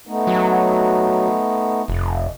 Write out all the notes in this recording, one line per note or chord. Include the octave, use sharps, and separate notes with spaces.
A3 B3 D#4
F#3
F1